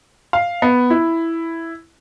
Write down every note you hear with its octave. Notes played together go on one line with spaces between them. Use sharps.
F5
B3
E4